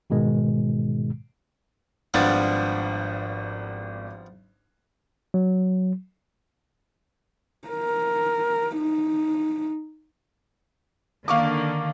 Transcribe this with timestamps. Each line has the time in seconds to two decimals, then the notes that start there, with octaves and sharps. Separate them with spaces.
0.10 G#2 B2 D#3 G#3
2.14 G#1 F3 G3 B3 D4 A6
5.34 F#3
7.68 A#4
8.77 D#4
11.28 D3 D#3 A#3 F5 C#6 D6